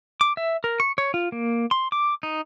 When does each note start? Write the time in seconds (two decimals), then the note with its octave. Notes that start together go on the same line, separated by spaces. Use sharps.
0.21 D6
0.37 E5
0.64 A#4
0.80 C#6
0.98 C#5
1.14 F4
1.32 A#3
1.71 C6
1.92 D6
2.23 D#4